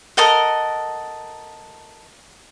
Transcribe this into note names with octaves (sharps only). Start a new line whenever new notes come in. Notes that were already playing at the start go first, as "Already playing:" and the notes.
A4 A#4 D#5 F#5